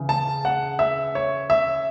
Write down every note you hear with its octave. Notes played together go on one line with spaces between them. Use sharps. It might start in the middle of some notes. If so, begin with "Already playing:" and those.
Already playing: C#3 E3
A5
F#5
E5
C#5
E5